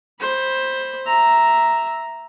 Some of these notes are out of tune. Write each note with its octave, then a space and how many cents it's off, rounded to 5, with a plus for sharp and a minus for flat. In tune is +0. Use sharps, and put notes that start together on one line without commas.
C5 +10 B5 -5
E5 +0 A#5 +0